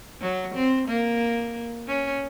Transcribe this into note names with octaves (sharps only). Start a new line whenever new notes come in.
F#3
C4
A#3
C#4